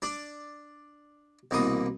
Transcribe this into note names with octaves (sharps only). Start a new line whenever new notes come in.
D4 D5 D6
C2 B2 E3 A#3 D#6